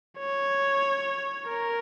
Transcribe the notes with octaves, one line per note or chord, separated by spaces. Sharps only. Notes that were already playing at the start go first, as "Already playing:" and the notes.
C#5
A#4